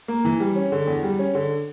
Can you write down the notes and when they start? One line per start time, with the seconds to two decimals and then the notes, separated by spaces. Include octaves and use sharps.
0.08 A#3
0.25 E3
0.40 G3
0.56 C#4
0.72 D3
0.87 E2
1.03 G3
1.19 C#4
1.35 D3